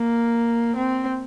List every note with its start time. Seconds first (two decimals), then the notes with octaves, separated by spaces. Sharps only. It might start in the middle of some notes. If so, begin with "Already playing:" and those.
Already playing: A#3
0.76 C4